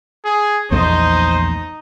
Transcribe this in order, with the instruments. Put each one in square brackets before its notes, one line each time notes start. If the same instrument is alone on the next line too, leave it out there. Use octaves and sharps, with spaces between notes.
[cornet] G#4
[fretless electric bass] A#1 E2 A3 [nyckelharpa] D#4 D#5 [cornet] C5